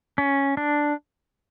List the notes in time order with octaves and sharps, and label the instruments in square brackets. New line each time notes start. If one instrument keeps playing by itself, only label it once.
[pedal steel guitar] C#4
D4